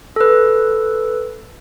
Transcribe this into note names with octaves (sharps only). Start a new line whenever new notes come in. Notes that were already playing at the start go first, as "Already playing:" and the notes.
A4 B4